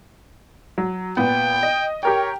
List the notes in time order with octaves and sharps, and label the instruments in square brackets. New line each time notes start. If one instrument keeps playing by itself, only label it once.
[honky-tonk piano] F#3
[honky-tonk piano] A#2 B3 [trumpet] G5
[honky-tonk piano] D#5
[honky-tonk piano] G4 A#4 G5 [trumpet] C#5